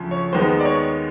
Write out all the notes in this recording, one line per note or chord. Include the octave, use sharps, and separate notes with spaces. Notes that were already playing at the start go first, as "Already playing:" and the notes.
Already playing: D2 C#3 F3
C#5
D#2 D#3 G#3 B3 C5
D5
C#5